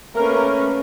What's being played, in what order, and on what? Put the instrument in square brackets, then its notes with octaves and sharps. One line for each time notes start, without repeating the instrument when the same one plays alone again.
[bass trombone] A3 [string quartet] A#3 C#4 B4 [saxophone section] A#4